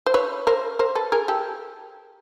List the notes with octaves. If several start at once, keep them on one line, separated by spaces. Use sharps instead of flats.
C5
B4 C#5
A#4 C5
A#4 C5
A4 B4
G#4 A#4
G4 A4